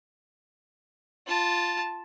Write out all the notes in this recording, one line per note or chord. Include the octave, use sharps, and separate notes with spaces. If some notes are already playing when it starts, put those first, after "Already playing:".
F4 A5